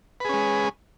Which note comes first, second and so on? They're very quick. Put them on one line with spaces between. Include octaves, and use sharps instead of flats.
B4 G#4 C#4 G#3